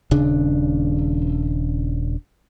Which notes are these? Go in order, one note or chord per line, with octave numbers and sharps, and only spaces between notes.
D#1 C#3 D4